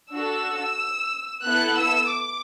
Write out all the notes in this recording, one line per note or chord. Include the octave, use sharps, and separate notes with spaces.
D4 F#4 A4 E6
B3 E4 A4 F#6
E6
D6